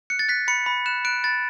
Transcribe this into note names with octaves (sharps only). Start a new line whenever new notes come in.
F#6 C#7
A6
F#6 B6
B5 C#7
B5
F#6 E7
F#6 D7
B5 A6